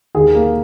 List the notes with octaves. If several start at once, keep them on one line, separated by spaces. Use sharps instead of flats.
D#2 G#4
A#3